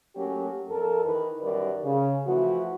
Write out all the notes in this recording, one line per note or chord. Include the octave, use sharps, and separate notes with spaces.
F#3 A3 A#3 C#4 G4
F2 A4 A#4
D#3 E3 A#4 B4
F#2 D#3 G3 A#4 B4 D5
C#3
E3 F3 A3 F#4